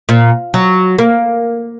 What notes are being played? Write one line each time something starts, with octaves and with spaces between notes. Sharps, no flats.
A#2
F#3
A#3